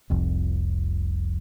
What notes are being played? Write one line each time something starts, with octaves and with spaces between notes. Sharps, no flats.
F1 C2 F2